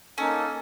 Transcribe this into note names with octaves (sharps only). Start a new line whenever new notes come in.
A#3 C#4 D#4 A4